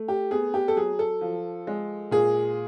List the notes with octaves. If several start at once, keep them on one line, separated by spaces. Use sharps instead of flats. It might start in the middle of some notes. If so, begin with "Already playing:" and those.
Already playing: A3
G4
B3 G#4
G4
A4
F#3 G#4
A4
F3
G#3
A#2 G#4